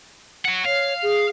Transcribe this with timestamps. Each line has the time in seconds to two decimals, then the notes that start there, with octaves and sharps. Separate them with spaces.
0.45 C#5 F#5
0.65 C#5 F5
1.02 G#4